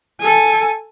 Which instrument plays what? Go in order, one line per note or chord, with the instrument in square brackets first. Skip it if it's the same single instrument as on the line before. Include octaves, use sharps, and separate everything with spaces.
[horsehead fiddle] A4 G#5